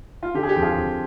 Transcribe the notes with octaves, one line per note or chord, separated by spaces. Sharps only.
F4
D3 G4
G#4
G4
F2
F4 G#4
F2